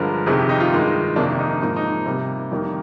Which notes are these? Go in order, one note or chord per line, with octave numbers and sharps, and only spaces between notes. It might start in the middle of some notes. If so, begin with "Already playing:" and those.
Already playing: G2 D3 F3 G#3 A#4
F2 C3 D#3 G#4
G4
D#4
F4
G2 D#3 G#3
F2 C3 D#3 A#3 D4
D#4
G#2 F3 A#3 D#4
D#4
C3 G3 A#3
F2 D#3 G3 A#3